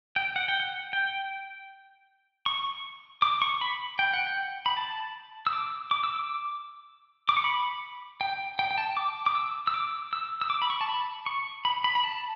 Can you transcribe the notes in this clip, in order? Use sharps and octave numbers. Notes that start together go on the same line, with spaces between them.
G5
F#5
G5
F#5
G5
C#6
D6
C#6
B5
G5
F#5
G5
B5
A5
E6
D6
D6
E6
D6
D6
C#6
B5
G5
G5
G5
A5
D6
D6
E6
E6
D6
E6
E6
D6
B5
C#6
A5
B5
C#6
B5
B5
B5
A5